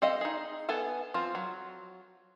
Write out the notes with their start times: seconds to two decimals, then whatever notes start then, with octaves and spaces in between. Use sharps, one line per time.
0.02 C4 A4 D#5 F5
0.21 D#4 G#4
0.69 B3 A4 G#5 A5
1.14 F3 C4 F4
1.35 F#3